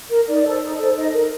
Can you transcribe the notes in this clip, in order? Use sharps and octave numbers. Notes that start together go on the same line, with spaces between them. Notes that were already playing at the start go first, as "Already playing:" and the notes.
A#4
D#4 D5
A4 C5
D#4
A4 C5
D#4 D#5
A#4